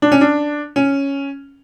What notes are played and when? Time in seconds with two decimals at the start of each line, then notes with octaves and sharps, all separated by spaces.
0.02 D4
0.12 C#4
0.21 D4
0.76 C#4